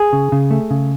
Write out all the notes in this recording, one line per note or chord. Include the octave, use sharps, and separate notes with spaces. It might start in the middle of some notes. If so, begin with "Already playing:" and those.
Already playing: G#4
C#3
C#3
A3
C#3